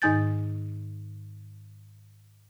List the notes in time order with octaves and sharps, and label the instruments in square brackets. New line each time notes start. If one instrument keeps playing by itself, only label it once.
[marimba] G#2 D#3 D#4 G#5 G6 A6